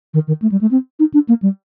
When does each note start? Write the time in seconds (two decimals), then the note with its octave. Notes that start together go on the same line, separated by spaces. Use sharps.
0.14 D#3
0.27 D#3
0.42 A3
0.52 G3
0.61 A3
0.71 C4
0.99 D#4
1.14 D4
1.29 A#3
1.42 G3